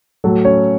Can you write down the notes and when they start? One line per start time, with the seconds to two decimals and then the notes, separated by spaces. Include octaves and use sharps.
0.24 A2 F#3 A4
0.45 C#4 C#5